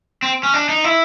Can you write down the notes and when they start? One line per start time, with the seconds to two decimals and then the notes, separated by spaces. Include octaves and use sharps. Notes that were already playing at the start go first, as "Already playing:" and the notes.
0.22 C4
0.43 C#4
0.54 D4
0.69 D#4
0.84 E4